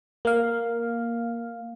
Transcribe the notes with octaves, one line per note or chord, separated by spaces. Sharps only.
A#3 F5